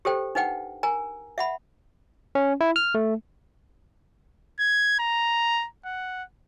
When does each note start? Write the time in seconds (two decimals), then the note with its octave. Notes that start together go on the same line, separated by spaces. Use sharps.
0.05 G4 A4 C5 G5
0.35 D4 D#4 B4 F#5 G5
0.83 A#4 G#5 A#5
1.38 E5 F#5 B5
2.35 C#4
2.61 E4
2.76 F6
2.95 A3
4.59 G#6
4.99 A#5
5.85 F#5